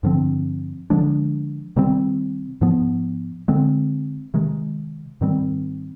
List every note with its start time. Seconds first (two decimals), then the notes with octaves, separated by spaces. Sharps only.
0.03 G2 D3 F3 C4
0.90 D3 F3 G#3 D4
1.76 C3 D#3 G3 C4
2.61 G#2 F3 B3
3.48 D3 G#3 C4
4.34 C3 D#3 G#3
5.21 G#2 D#3 G3 C4